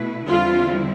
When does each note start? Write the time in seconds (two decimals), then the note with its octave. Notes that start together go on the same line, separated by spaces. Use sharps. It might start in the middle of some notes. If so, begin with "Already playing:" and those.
Already playing: B2 A3 E4 B4
0.27 E2 D3 G3 C4 E4 F4